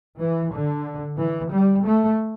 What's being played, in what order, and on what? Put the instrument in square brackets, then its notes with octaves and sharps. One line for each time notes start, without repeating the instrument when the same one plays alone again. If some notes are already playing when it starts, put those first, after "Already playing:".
[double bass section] E3
D3
E3
G3
A3